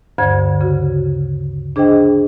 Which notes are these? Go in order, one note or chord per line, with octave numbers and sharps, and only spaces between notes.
D2 G2 D3 C5 G#6
C#3 F#4
D4 G#4 C5 D#5 G5